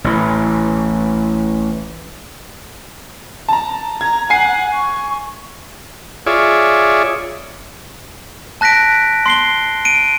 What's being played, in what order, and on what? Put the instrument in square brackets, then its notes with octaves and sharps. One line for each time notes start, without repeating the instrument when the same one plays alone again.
[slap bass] A1 E3
[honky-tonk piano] A5 A#5
[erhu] A#5 [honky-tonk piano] G#6
[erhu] F#5 [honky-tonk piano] G#5 C7
[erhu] C#6
[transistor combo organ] F4 G#4 C#5 D5 E5
[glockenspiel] A5 F#6 A#6 B6 D7
C6 C7 G7
D7 D#7